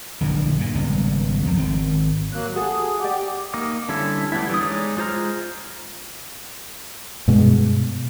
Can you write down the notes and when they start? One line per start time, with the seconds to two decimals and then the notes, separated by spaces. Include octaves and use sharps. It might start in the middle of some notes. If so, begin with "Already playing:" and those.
0.21 A#1 F#2 D3 E3
0.59 G2 A#2
0.75 G#1 C#3 G3 B3
1.45 F2 F3
1.57 G#1 D#3 C4
2.33 F#3 A#3 F#6
2.55 F#4 G#4 A4
3.00 G4 D5 F#5
3.54 A#3 D#4 D6
3.89 D3 G3 C#4 E4 A4
4.32 G3 A3 B3 E4
4.50 E3 D4 D#6
4.61 G#3 D#4 C#5 D5
4.97 G#3 F4 C5 A#5 F6
7.28 G2 B2 G#3